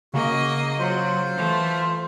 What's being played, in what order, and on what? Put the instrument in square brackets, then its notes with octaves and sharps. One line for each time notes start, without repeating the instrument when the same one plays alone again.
[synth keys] C#3 [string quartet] A#3 D#5 [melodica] F#4
[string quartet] F#3 [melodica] F4 C5
[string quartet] E3 A3